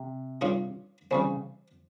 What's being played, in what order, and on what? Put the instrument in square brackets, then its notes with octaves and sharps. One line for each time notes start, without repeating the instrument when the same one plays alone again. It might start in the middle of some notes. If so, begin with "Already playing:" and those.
Already playing: [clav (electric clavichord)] C3
[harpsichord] G2 G3 C#4 F4 G#4
[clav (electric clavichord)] C#3 [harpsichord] E3 G3 C4